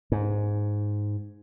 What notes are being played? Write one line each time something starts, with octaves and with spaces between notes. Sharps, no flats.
G#2